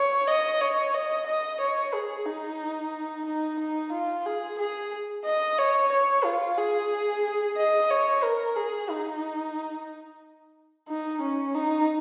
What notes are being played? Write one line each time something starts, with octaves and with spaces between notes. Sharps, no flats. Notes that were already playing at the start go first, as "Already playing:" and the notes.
Already playing: C#5
D#5
C#5
D#5
D#5
C#5
G#4
D#4
D#4
D#4
F4
G#4
G#4
D#5
C#5
C#5
F4
G#4
D#5
C#5
A#4
G#4
D#4
D#4
C#4
D#4